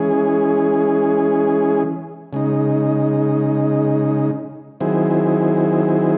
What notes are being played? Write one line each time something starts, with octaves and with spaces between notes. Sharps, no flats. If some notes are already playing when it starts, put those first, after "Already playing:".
Already playing: E3 G#3 C#4 G#4
C#3 G#3 D#4
D#3 F#3 C4 E4 G#4